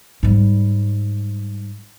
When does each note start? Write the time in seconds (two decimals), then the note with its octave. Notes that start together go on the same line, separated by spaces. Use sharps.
0.23 G#2 G3